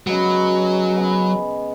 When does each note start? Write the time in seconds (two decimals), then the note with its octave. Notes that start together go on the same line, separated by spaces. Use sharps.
0.07 C#3 F#3 G#3 B3
0.97 C#3 G#3 B3